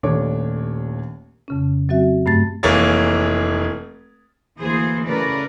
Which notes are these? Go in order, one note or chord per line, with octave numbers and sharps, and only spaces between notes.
D#1 D#2 A3 D4 C#5 D6
F2 C#3 C#4
F#3 C4 F#4 E5
G2 A3 A6
F1 E3 A#3 G#4 C#5 A6
D2 E3 A#3 G#4 C5
C#3 A3 A#4 B4 D5